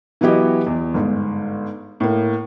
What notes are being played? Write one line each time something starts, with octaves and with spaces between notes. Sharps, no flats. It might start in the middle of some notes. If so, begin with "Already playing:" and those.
E3 F#3 B3 E4 G4 D#5
E2
G1 G#2
A2 A#3